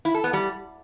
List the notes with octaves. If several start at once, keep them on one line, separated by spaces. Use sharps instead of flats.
E4
A4
B3
G3